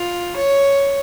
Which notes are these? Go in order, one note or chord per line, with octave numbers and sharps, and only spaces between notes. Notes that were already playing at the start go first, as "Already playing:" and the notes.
Already playing: F4
C#5